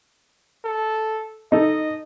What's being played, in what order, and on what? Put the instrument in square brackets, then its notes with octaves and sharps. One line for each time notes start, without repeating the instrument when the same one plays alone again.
[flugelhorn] A4
[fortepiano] D#4 A4 [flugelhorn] D#5